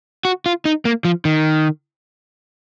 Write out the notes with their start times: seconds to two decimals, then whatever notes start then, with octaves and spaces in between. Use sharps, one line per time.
0.25 F#4
0.46 F4
0.65 D#4
0.85 A#3
1.05 F3
1.25 D#3